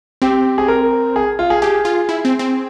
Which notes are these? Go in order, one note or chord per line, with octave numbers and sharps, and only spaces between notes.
C4 G4
G#4
A#4
G#4
F4
G#4
G4 G#4
F4
E4
C4
C4